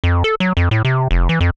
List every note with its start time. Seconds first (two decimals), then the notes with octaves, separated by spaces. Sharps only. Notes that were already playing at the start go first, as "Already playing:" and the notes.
0.04 F2
0.24 A4
0.40 F#3
0.57 F2
0.71 A2
0.85 C3
1.11 F1
1.29 E3
1.41 F2